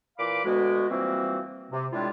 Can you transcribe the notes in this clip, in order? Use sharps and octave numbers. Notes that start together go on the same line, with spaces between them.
A#2 E3 F5 B5 D6
D2 B2 G#3 B3 F#4
E3 F3 G3 A#3 C4 F#4
C3
A2 G3 G#3 D4 E4 F4